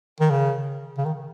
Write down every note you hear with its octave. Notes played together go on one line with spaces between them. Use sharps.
D#3
C#3
C#3
D#3